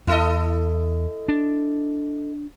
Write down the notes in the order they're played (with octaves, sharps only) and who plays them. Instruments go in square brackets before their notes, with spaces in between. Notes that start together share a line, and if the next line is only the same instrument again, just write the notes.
[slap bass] E2 [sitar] E4 A4 D#5
[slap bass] D4